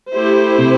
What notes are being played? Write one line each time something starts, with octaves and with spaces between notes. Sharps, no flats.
A3 E4 G4 C5
C3